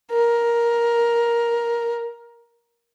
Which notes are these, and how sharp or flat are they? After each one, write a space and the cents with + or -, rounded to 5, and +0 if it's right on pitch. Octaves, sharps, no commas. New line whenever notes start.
A#4 +10